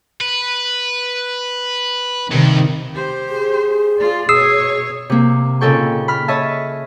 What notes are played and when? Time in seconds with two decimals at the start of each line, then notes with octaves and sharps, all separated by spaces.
0.21 B4
2.31 G2 C3 D#3
2.92 G4 C5
3.29 G#4
3.99 F4 D5
4.29 B2 C#5 D#6 E6 C7
5.10 C3 A#3
5.61 A#2 C#3 D#4 A4 G5 C#6
6.08 B5 F6
6.28 C#5 D#5 E5 A5